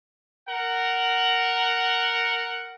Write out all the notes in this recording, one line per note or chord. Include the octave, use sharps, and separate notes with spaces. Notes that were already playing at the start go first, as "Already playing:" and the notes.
A#4 F#5